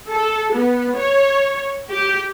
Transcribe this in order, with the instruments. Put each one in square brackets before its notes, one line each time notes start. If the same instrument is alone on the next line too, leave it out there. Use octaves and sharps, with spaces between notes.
[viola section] A4
B3
C#5
G4